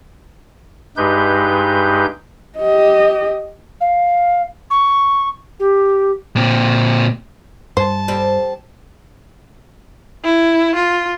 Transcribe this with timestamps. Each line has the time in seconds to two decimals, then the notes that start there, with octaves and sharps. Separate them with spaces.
0.97 G2 G#3 D#4 G4 B4 G6
2.58 G4 D#5
3.81 F5
4.70 C#6
5.60 G4
6.36 A#2 C4
7.77 G2 C5 A5
8.08 G3 C4
10.24 E4
10.75 F4